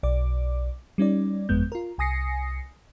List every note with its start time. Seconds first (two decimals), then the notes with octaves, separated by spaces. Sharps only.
0.03 B1 D5 D6
0.98 G3 C#4 D#4 D5
1.49 G1 F2 G#3 B3 G6
1.72 F4 A#4
1.98 C2 G#5 D#6 A#6 C7 C#7